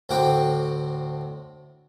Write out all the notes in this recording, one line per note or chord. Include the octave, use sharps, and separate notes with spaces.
D2 A2 C4 F#4 G5 D6